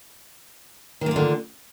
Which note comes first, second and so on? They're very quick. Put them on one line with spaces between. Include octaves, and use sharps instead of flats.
D#3 A#3 F4 D3